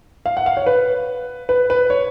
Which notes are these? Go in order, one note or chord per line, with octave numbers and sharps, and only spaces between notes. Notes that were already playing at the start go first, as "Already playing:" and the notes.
F5
F#5
F5
C#5
B4
B4
B4
C#5